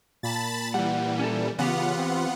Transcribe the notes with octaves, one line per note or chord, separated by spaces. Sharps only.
A#2 A5 B5 A6
E3 G3 F#5
C#4 A4
C#3 E3 B3 F4 G4 F#5
C4